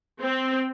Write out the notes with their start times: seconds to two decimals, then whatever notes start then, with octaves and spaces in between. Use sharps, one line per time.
0.21 C4